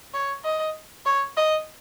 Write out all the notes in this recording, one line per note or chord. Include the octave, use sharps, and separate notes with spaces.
C#5
D#5
C#5
D#5